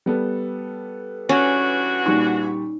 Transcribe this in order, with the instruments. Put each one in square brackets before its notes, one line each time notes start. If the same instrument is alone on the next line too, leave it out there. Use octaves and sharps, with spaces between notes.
[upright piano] G3 B3 A4
[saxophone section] E3 D4 F#4 [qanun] C#4
[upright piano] A#2 G3 C#6 [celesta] D#4